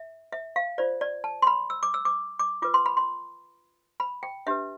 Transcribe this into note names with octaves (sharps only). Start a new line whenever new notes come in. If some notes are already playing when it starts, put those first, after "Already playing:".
Already playing: E5
E5
F5
F4 C5 D5
D5
A5
C6
B5
E6
D6
E6
D6
D6
F4 B4 D6
C6
B5
C6
B5
G5
D4 G4 B4 E5